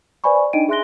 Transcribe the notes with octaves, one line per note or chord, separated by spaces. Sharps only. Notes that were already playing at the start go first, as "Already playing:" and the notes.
B4 C5 D5 G#5 B5 C#6
D4 D#4 D#5 G5 D7 D#7
G#4 E5 C6 F#6 A#6 G7